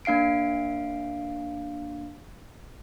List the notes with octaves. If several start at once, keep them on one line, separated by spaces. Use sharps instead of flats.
A#3 D4 F5 C7 D7